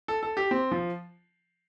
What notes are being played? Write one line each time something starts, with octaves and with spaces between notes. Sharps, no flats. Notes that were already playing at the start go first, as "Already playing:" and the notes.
A4
A4
G4
C4
F3